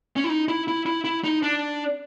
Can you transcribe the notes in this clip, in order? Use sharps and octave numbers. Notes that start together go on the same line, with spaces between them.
C#4
E4
D#4
E4
E4
E4
E4
D#4
D4